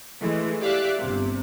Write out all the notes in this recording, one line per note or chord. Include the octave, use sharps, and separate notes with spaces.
E3 G#3 A3
G4 D5 E5 F5 D6 F#6
G1 C3